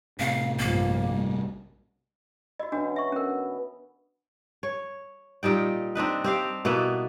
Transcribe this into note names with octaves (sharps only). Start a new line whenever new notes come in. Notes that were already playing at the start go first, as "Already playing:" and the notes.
A2 C3 F5
A#1 G2 F3 A#3
G3
E4 F#4 D#5
B2 E3 C#4 D4 F#4
E5 C#6
B3 C#4 A#4
C#5
A#2 G3 D#4 G5
C4 D4 D#4 B4
C4 G4 F5
B2 A#3 B3 E4